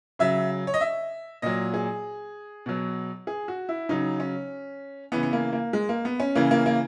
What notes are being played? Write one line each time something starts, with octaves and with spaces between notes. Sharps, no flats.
C#3 F#3 E5
C#5
D#5
E5
A#2 F#3 D#5
G#4
B2 F#3
G#4
F#4
E4
C#3 F#3 D#4
C#4
C#3 E3 B3
B3
A#3
A#3
G#3
A#3
B3
C#4
C#3 E3 A#3
A#3
A#3